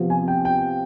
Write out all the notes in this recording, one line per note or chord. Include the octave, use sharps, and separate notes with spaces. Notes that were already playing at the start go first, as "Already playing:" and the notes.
Already playing: C3 F3 B3 F4
G#5
G5
G5